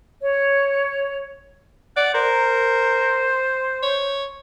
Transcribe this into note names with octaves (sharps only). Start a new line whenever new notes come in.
C#5
D5 F#5
A#4 C5
C#5